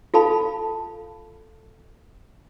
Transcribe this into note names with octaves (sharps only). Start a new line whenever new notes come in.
F4 A4 F5 A5 B5